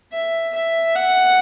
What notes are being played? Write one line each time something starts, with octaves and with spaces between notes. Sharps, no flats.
E5
E5
F#5